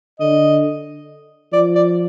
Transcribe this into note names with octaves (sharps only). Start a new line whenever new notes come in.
D3 D#5
F3 D5
D5